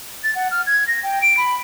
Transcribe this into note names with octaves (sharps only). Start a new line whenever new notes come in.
A6
F#5
F6
G#6
A#6
G5
D7
B5